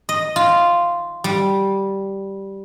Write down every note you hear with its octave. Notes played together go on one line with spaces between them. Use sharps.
D#5
F4
G3